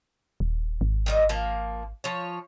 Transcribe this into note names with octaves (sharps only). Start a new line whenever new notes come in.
D#1
G#1
D#3 G3 D#5
F3 A#3
F3 C#5